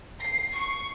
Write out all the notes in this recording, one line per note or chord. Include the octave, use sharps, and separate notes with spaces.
C7
C#6